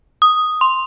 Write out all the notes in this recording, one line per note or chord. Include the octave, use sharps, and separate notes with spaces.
D#6
C6